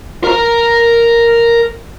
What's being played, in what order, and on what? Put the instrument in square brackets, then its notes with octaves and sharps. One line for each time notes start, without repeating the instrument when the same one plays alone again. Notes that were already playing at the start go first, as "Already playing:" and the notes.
[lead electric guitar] A#4 A#5